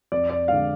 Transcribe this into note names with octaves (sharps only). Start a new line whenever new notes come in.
F2 D5
D5
D3 G#3 F5